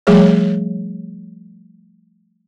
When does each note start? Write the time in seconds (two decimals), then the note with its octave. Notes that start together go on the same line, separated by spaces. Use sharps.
0.07 F3 G3 A3 G#4 C#5